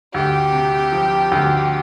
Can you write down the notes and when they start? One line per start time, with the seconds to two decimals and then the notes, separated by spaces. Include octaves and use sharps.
0.14 D2 G4
0.53 C3
0.92 F3
1.32 D2